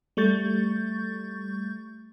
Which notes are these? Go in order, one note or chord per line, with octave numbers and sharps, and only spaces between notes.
G3 A3 C#6 G6 A6